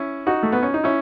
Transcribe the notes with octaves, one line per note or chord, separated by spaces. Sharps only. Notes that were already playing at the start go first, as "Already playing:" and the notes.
Already playing: C#4 E4
D#4 F#4
A3
B3
C#4
D#4
C#4 E4